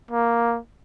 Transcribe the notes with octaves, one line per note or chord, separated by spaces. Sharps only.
A#3